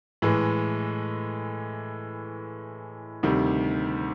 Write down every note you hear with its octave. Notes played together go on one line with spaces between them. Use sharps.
A2 E3 G#3
D2 C3 D#3 G3